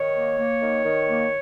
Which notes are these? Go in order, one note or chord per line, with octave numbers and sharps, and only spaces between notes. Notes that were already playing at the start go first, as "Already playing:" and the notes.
Already playing: D#3 C#5
A#3
A#3
D#3
D#3
A#3